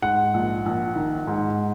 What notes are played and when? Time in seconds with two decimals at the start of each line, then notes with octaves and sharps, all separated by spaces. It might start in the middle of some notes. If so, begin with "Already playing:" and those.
0.02 G#2 F#5
0.34 A#1
0.66 A#1
0.96 D#3
1.27 G#2